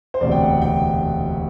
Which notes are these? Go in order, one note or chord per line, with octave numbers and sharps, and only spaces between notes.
C5
E1 D2 C3 D5
G5
F#5
G5